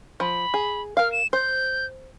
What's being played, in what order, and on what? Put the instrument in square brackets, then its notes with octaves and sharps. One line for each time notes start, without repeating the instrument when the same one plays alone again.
[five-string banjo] F3 [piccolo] B5
[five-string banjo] G#4
[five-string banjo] A#4 F5 [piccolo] F6
[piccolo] E7
[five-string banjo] C5 [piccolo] G6